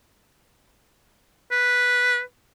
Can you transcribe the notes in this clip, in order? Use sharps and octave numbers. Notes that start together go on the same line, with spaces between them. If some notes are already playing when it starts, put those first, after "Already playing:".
B4